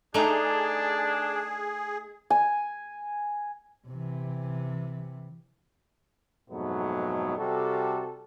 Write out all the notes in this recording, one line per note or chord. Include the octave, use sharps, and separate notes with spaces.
A3 D4 D#4 G#4
G#5
C3 E3
F2 G#2 B2 F#3 A3 B3
C3 G3 F#4 A4